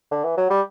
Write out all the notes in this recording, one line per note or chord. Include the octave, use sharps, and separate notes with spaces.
D3
E3
F#3
G3